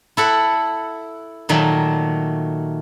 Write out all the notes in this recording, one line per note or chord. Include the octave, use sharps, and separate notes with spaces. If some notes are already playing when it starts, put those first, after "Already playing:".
E4 A4 F#5
A#2 D#3 F#3 A3